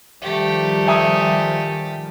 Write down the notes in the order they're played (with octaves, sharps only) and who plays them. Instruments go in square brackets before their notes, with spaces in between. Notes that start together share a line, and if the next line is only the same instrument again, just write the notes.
[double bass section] D#3 F3 G3 [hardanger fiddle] A3 G4
[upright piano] E5 G#5 D#6